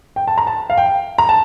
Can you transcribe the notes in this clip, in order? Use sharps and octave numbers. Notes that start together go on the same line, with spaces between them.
G5
A5
A#5
A5
F5
G5
A#5
A5